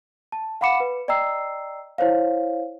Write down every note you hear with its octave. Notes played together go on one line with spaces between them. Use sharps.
A5
F5 F#5 B5 D6 C#7 E7
B4
D5 D#5 G5 A#5 E6 C7
E4 C5 C#5 F5